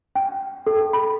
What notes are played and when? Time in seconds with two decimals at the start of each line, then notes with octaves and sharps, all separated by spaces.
0.15 G5
0.67 A4
0.93 B5